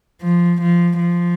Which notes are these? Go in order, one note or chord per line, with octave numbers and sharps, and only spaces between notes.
F3
F3
F3